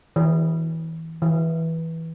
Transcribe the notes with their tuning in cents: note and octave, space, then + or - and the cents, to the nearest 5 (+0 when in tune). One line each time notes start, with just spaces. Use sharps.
E3 -25
E3 -15